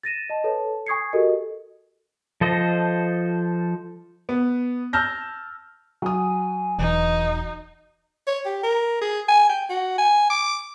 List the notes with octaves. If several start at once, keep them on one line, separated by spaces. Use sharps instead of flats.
A6 A#6 D#7 E7
D#5 A5
A4 B4 C#5 A5
G#5 C#6 D#6 G#6 C7 C#7
F#4 G4 A4 A#4 D#5
F3 A4 C5 D#5
B3
A5 E6 F6 G6 A#6
F#3 G#5 D#6
E1 E3 D#4
C#5
G4
A#4
G#4
G#5
G5
F#4
G#5
D6